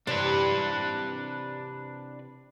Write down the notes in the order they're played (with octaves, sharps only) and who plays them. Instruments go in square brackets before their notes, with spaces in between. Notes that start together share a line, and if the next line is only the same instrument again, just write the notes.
[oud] C3 E3 [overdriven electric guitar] D4 B4